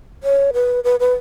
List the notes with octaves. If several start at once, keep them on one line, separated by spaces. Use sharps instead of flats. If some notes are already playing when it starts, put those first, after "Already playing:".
C#5
B4
B4
B4